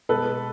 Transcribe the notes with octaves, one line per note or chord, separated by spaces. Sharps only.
B2 G#3 B3 A4 B4